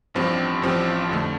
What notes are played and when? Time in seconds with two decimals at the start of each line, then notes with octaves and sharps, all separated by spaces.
0.14 A1 G2 F3 C4 G4
0.62 A1 G2 F3 C4 G4
1.09 F2 D3 A3